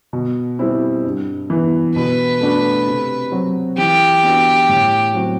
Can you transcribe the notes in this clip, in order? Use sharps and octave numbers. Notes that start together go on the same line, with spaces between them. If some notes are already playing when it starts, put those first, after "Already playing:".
B2
G3 C4 E4
G2
E3 B3
B2 B4
A3 D4 F#4
C3
F#3 C4 F#4
E3 G4
B3 D4 F#4
A2
F#3 C4 F#4